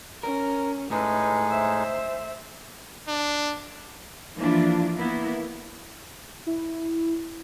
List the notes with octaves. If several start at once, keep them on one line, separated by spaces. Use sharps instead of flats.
C#4 A#4
A2 G#3 D#4 G#4 B4
C5 E5
D4
E3 F3 A#3 D4 E4 F4
A#3 B3 E4
E4